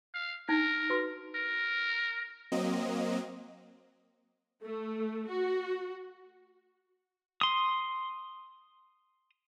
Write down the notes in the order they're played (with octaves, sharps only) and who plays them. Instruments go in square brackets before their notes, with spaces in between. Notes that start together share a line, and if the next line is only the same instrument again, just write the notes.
[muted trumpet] F5
[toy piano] D4 D#4 [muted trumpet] A#4
[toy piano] F#4 B4
[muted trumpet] A#4
[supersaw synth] F#3 A#3 C4 D#5
[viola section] A3
F#4
[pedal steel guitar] C6 D#6